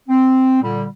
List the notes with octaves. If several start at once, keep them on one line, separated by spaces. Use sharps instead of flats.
C4
A#2 D3 G3